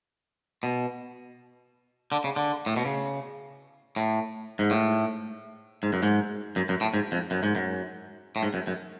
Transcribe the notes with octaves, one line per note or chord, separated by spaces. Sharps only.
B2
D3
C#3
D3
A2
B2
C#3
A2
G#2
A2
G#2
F#2
G#2
F#2
F#2
A2
G#2
F2
F#2
G#2
F#2
A2
G#2
F#2
F#2